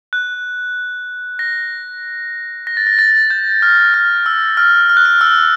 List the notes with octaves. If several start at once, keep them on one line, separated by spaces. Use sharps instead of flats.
F#6
A#6
A#6
A6
A#6
A6
G6
F6
F6
E6
F6
F6
F#6
F6
E6